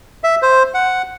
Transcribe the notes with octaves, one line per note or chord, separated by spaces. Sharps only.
E5
C5
F#5